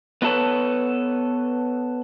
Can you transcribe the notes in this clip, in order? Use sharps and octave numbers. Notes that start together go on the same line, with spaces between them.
B3 D#4 E4 A4 B4 C#5